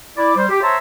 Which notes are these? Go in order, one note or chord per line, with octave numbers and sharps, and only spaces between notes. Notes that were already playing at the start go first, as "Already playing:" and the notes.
E4 D5
G3 C5
G4
C5 C#5 E5 A5 A#5 C6